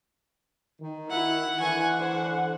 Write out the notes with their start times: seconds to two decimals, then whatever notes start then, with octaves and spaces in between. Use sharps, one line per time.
0.81 D#3
1.10 E4 F#5
1.60 D3 E3 F#5 G#5 C#6
1.97 C5